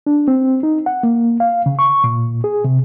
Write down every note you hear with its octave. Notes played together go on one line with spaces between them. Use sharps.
D4
C4
D#4
F#5
A#3
F5
C#3
C#6
A#2
G#4
C3